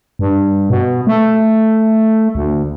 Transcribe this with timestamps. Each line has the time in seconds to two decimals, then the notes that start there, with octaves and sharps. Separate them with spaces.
0.19 G2
0.69 B2
1.07 A3
2.35 D2